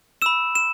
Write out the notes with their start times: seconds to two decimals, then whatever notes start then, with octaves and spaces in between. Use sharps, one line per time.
0.22 B5 E6 E7
0.55 E7